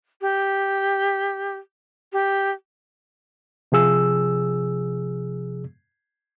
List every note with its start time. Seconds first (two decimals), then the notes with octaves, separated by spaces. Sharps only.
0.21 G4
2.13 G4
3.72 C3 F3 G#4 E6